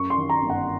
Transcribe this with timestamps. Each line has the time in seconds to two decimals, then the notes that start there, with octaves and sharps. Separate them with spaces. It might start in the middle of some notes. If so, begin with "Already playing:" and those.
Already playing: F#2 C#6
0.10 C6
0.17 D#3
0.30 A#5
0.42 G1
0.50 F#5